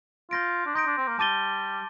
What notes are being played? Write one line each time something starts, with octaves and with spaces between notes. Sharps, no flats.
F4 C6 G6 A#6 D7
D4
D#4 C6 G6 A#6 D7
D4
C4
A#3
G3 A5 D6 A6 D#7 G7